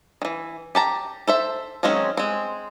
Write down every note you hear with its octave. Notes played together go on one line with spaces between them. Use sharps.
D#3 E3
G4 A5 A#5
A4 C5 E5
D#3 F#3 G#3 C4 C#4
G#3 C4